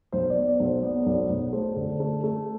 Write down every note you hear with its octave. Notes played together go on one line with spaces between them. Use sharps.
B1 C5
D5
B3
D5
B1
C5
B3 D5
B1 D5
C5
B1
A3 C5
D3
A3
A3